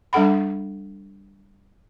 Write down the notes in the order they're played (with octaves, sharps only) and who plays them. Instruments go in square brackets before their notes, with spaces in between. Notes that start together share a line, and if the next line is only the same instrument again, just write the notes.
[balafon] G3 D4 A4 F#5 B5